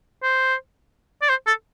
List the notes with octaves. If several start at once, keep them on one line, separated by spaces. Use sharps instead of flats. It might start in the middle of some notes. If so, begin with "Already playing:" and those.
C5
D5
C5
A4